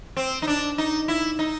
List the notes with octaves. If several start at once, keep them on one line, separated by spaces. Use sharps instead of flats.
C4
D#4
D4
D#4
E4
D#4